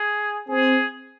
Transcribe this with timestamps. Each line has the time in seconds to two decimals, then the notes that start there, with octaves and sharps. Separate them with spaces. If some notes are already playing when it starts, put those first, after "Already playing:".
Already playing: G#4
0.49 C4 G#4